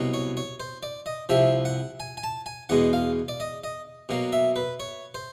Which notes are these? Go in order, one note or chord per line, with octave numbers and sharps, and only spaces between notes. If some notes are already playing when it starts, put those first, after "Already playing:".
Already playing: C2 B2 F#3
C#5
C#5
C5
D5
D#5
C2 C3 F3 E5
F#5
G#5
G#5
A5
G#5
E2 B2 G#3 F#5
F5
D5
D#5
D#5
B2 F#3 A#3
E5
B4
C#5
C5